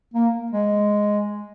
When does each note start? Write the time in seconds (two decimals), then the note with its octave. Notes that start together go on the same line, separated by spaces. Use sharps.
0.14 A#3
0.52 G#3